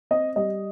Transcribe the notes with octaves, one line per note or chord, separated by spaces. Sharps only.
C4 D#5
G3 D#5